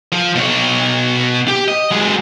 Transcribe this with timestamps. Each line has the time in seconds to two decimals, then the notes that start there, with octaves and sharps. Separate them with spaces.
0.12 F3
0.36 B2 C#5
1.48 G4
1.68 D#5
1.91 F#3 G#3